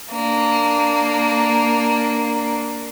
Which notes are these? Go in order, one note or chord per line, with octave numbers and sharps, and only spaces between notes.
A#3 D4